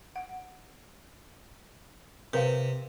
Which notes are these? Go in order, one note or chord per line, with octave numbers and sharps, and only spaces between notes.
F#5
C3 A#4 B4 F5